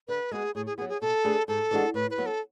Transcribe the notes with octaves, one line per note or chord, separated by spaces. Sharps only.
D3 B4
G#3 B3 F#4 G#4 B4
A2 G#4
G#4
F#3 B3 G#4
G#4
B2 A4
A3 D4 G#4 B4
G#2 A4
E3 G#3 D4 F#4
A2 B4
B4
F#3 B3
A4